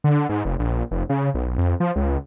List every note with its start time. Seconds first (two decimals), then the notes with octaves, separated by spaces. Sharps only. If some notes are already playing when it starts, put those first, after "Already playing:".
0.04 D3
0.29 G#2
0.45 F1
0.59 A#1
0.91 F1
1.09 C#3
1.34 B1
1.58 F2
1.80 F3
1.96 C#2